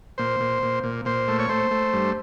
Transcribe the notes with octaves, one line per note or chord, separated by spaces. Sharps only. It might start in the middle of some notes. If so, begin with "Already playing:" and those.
A#2 C5
A#2
A#2
A#2
A#2 C5
A3
C#5
A3 C5
A3
G2